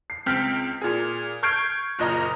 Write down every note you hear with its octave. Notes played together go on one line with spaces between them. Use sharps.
C7
C#2 C4 G5 F6 B6
A#2 G#4
C#6 F6 G6 G#6 C7 D7
F#1 A#2 D#5 A#5